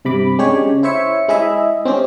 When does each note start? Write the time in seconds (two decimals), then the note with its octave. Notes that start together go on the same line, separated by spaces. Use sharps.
0.05 G2 C3 B5 D6
0.39 G#3 C#4 D4 G4 C#5
0.66 C#3
0.83 E4 C5 C#5 E5 C#7
1.28 G#3 E4 G#4 D#5 E5
1.85 C4 C#4 G4